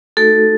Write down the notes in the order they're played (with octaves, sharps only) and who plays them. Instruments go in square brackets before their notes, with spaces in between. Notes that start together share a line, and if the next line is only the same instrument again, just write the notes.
[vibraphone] A3 D#4 F#4 A4